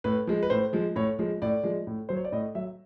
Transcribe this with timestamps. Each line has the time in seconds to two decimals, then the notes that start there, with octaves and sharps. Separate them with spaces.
0.04 A2 B4
0.27 F3 G#3
0.43 B4
0.50 A2 C5
0.73 F3 G#3
0.96 A2 C#5
1.19 F3 G#3
1.42 A2 D5
1.64 F3 G#3
1.87 A2
2.09 F#3 C5
2.16 C#5
2.25 D5
2.32 A2 D#5
2.55 F#3 E5